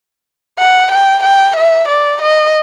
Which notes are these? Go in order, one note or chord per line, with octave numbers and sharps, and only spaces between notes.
F#5
G5
G5
E5
D5
D#5